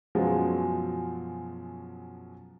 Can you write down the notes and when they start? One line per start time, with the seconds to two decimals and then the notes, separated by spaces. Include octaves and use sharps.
0.15 F#2 B2 F3 F#3 G#3